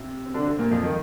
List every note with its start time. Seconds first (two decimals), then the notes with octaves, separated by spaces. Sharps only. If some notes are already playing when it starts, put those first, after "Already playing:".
Already playing: C3
0.26 C4
0.34 D3 D4
0.46 C3 C4
0.59 A#2 A#3
0.71 F2 F3
0.84 D#3